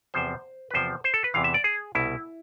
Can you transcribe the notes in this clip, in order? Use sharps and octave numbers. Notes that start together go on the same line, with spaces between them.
E2 C3 F3 C5
B4
E2 C3 F3 C5
C5
A4
B4
E2 C3 E3 F5
E5
D5
G#4
C2 B2 E4